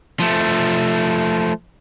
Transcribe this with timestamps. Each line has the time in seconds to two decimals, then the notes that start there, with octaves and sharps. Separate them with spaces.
0.20 F3 A3